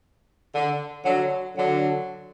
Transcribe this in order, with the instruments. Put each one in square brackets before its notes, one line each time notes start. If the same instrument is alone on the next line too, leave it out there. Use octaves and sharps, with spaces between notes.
[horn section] D3
D3 F#3
D3 F#3